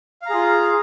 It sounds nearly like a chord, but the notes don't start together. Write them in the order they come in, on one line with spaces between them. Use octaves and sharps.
F5 A#5 G#4 F4